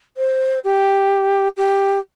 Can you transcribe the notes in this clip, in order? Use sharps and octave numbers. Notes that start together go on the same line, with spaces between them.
C5
G4
G4